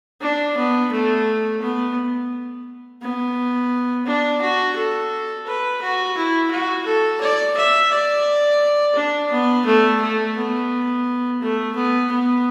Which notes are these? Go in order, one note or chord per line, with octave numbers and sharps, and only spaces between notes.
D4
B3
A3
B3
B3
D4
F#4
A4
B4
F#4
E4
F#4
A4
D5
E5
D5
D4
B3
A3
A3
B3
A3
B3
B3